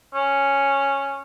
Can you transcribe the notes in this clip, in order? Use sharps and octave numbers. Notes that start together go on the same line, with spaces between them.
C#4